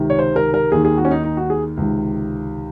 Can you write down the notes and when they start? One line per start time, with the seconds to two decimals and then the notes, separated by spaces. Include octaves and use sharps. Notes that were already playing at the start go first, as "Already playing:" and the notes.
Already playing: C#2 C3 D#3
0.10 C#5
0.19 C5
0.36 A#4
0.54 A#4
0.72 D#2 D#3 G#4
0.85 G#4
0.98 F#4
1.05 C#4
1.11 D#4
1.24 D#4
1.37 F#4
1.50 G#4
1.77 C#2 C3 D#3